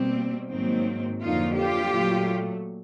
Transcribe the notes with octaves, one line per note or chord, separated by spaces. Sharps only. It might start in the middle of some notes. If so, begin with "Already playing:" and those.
Already playing: B2 G3 A#3 C4
G#2 D#3 F#3 A#3 C4
F2 D3 F#3 A#3 D#4 F4
F4 G4
A#2 F#3 A3